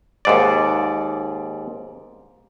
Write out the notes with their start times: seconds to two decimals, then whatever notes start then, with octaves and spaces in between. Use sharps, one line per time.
0.25 D#2 G#2 D5